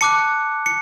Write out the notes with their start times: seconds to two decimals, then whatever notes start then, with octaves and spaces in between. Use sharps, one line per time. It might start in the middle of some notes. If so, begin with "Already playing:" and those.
0.01 A5 D6 F#6 C#7
0.66 C#7